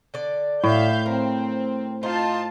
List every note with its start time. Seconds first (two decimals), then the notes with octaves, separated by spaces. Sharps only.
0.14 D3 D5
0.64 A2 E5 F5 G6
1.06 C4 A#4
2.03 D#4 F4 C5 A5